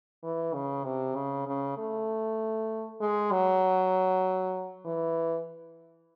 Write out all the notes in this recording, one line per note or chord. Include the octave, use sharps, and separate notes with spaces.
E3
C#3
C3
C#3
C#3
A3
G#3
F#3
E3